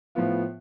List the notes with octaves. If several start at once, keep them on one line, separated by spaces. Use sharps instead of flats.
A2 F3 B3 F4